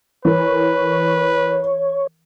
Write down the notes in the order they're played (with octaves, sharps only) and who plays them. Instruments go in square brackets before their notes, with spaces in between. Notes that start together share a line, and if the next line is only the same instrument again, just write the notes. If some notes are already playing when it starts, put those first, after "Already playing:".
[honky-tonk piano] E3 A#4 [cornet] B4 [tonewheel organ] C#5